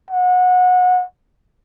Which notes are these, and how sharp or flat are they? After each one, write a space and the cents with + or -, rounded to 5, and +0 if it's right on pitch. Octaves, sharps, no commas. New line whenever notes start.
F#5 -25